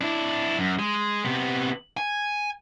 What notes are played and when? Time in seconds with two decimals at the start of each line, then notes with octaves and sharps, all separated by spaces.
0.01 D4 E4
0.59 F#2
0.79 G#3
1.25 C3 B3
1.97 G#5